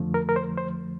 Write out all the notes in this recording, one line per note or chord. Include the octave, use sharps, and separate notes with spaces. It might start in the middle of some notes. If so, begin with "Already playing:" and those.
Already playing: F2 D3 F3 A3
A#4
A#4
C5
C5